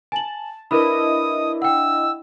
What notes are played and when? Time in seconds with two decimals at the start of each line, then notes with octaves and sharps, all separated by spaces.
0.12 G#5 A5 F#7
0.71 D4 E4 A#4 B4 D#5 B5 D#6
1.62 F#5 G5 E6